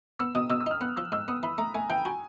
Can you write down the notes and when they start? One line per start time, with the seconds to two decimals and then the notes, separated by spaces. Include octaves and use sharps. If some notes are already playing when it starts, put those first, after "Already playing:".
0.19 B3 E6
0.35 B2 D#6
0.50 B2 E6
0.60 E6
0.66 D#4 F6
0.81 B3 F#6
0.96 F3 E6
1.12 G#2 E6
1.28 B3 D#6
1.43 E3 B5
1.58 A3 A#5
1.74 A3 G#5
1.89 E3 G5
2.05 F#4 G#5